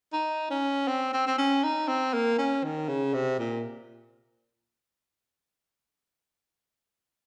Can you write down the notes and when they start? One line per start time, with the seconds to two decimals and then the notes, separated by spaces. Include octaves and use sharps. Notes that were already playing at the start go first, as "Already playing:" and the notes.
0.13 D#4
0.50 C#4
0.88 C4
1.13 C4
1.27 C4
1.38 C#4
1.63 D#4
1.88 C4
2.13 A#3
2.38 C#4
2.64 D#3
2.88 C#3
3.14 C3
3.39 A#2